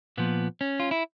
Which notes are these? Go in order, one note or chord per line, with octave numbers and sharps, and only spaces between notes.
A#2 F3 B3
C#4
F4
E4